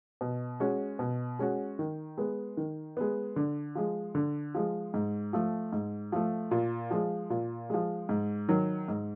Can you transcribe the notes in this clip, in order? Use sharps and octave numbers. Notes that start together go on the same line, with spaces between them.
B2
G#3 C#4 F#4
B2
G#3 C#4 F#4
D#3
G#3 B3
D#3
G#3 B3
D3
F3 G#3
D3
F3 G#3
G#2
F3 A3
G#2
F3 A3
A#2
F3 G#3
A#2
F3 G#3
G#2
D#3 F#3
G#2